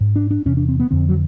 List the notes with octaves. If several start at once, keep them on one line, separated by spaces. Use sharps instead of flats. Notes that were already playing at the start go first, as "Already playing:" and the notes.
G#2
D4
D4
E2 C3 C#4
D4
C4
B3
F2 D3 C4
F#3